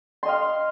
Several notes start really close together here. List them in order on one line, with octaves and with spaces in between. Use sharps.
C6 D#5 F5